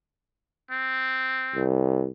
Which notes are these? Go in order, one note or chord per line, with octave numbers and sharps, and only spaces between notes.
C4
C2